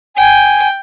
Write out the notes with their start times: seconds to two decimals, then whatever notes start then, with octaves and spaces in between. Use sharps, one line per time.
0.17 G5 G#5